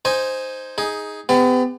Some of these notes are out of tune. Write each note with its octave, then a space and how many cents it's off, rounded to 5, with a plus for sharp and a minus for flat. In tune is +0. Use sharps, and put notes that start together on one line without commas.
D#4 +0 C5 +0 G#5 +0
D#4 +15 G#4 +0
B3 +40 G4 +40